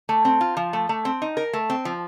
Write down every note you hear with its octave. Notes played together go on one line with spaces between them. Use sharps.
A3
C4
F4
F3
A3
A3
C4
D#4
A#4
A3
C4
F3